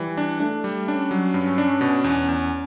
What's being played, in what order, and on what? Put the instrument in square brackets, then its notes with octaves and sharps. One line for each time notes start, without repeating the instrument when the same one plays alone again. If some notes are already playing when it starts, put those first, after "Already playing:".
Already playing: [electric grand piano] E3 [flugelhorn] G3
[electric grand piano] D4
[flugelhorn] A3 [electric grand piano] D4
[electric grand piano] G3
[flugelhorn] C#4 [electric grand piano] D4
[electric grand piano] F#3
G2
D4
B2
E2
E2